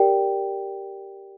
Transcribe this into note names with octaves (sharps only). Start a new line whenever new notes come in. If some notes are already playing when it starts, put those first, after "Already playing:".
Already playing: G4 A#4 D5 G5